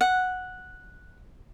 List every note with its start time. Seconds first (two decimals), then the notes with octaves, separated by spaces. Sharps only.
0.01 F#5